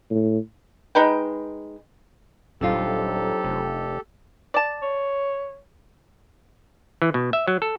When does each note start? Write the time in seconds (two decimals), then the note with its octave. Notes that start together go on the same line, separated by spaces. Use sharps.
0.11 A2
0.95 G#3 D#4 B4 G5
2.61 D#1 F2 F#3 D4 D#4 F4 G4 A4
3.45 F1
4.54 D5 A5
4.82 C#5
7.02 E3
7.14 B2
7.33 E5
7.47 F#3
7.62 A4